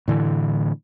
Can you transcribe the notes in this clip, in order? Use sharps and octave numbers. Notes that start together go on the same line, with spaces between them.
A2 D3 E3